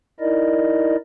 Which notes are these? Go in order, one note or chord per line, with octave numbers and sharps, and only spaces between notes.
D#4 E4 A#4 D5 D#5